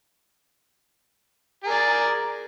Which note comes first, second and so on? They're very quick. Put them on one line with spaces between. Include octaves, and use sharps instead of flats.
G#4 A#4 D5